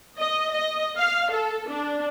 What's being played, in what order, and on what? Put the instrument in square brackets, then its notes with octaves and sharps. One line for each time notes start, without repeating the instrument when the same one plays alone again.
[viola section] D#5
D#5
F5
A4
D4